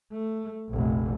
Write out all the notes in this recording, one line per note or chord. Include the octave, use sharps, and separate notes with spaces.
A3
F1 A#1